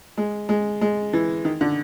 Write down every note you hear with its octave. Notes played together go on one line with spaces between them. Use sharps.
G#3
G#3
G#3
E3
D#3
D3